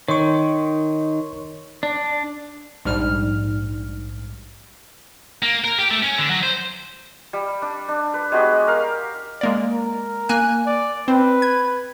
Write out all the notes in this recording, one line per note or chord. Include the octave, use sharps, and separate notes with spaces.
D#3 C#5 C6 C#6
D4 D5
A#1 G#2 G3 F6
A#3
A#4
G4
A3
C#4
D3
F#3
C5
G3
D4
D4
B4
G#3 B3 F#4 G4
A#4 F5
G#3 A#3 D5
A#4
A#3 G#5 F#6
D5
C4 B4
G#6